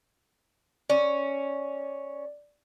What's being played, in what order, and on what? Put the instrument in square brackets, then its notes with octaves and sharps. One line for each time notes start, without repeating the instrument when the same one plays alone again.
[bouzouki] C#4 [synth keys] D5